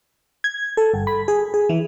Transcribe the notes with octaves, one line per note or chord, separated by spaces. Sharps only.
G#6
A4
G1
B5
G#4
G#4
E3